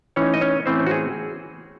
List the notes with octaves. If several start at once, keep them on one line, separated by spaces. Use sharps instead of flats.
E3 A3 C#4 D#4 C#5
D#5
C#4 C#5
A2 E3 A3 C4 C#4 C5
F#4
G#4